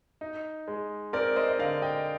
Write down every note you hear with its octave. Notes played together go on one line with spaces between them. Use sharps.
D#4
G#3
C4 A#4 D5
C5 D#5
D#5
D3 D5 F5
D#5 G5